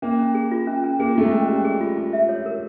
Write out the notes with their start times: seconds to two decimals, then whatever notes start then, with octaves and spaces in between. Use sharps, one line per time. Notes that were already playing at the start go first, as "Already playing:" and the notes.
0.02 A#3 C#4
0.19 C#4
0.35 G#4
0.51 F4
0.67 C#4
0.84 C#4
0.99 A#3 G#4
1.15 A3 F4
1.24 G#3
1.32 C#4
1.48 G3 C#4
1.64 G#4
1.81 F4
1.97 F4
2.13 E5
2.29 C#5
2.46 A#4